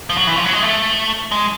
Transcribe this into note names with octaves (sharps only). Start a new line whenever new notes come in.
F3
F#3
E3
F3
F#3
G#3
A3
G#3